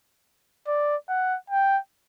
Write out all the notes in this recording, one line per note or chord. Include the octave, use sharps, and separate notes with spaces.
D5
F#5
G5